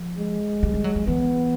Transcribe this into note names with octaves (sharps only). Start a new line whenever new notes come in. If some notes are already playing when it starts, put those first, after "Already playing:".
Already playing: F3
G#3
G3
G3
F#3
F#3
E3 B3